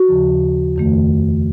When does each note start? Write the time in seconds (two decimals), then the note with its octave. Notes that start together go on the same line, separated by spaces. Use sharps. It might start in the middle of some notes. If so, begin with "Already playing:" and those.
Already playing: F#4
0.08 D#2 C#3 F3
0.76 F2 D#3 A3